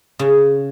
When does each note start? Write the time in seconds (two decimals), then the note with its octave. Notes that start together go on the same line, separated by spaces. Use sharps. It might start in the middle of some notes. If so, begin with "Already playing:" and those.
0.19 C#3